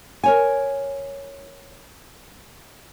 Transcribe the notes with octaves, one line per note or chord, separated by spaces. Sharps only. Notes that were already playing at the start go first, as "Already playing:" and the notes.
A#4 C#5 G#5